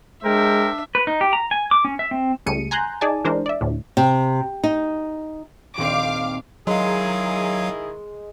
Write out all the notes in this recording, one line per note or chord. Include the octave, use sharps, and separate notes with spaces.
G#3 D4 A#4 C5 E5 G5
B4
D#4
G4
A#5
G#5
D6
C#4
E5
C4
C#2 G3 A3 G#4 C#7 D#7
G#5 A#5 C6 F#6 G6
D#4 G#4 D5 G#5 A5
E3 G#3 D4 A#4 C5
D5 E5
D2 A2
C3
D#4
D#1 C4 F5 D6
D#3 F#3 G#3 E4 G#4 F5